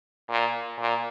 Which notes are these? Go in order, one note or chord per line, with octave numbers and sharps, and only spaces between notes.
A#2
A#2